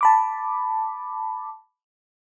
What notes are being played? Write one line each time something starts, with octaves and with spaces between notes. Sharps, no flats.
A5 B5 D6